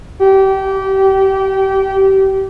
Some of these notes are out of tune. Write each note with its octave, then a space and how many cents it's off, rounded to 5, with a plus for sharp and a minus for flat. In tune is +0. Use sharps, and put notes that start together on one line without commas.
G4 -25